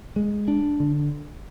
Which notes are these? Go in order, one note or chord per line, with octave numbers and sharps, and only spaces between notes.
G#3
D4
D3